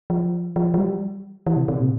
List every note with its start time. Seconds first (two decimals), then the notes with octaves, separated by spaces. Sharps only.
0.10 F3
0.56 F3
0.74 F3
0.78 G3
1.47 E3
1.57 C3
1.68 C3
1.80 A#2